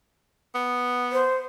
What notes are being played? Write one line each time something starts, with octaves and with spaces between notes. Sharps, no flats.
B3
C5